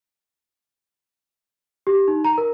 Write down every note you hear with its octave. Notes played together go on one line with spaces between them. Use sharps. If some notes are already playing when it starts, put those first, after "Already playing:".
G4
D#4
A#5
A#4